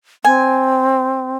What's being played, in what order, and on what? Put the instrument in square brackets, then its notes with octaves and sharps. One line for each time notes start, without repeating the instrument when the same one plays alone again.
[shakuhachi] C4 [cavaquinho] G#5